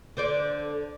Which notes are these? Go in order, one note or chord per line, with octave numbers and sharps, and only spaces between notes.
D3 C5 D5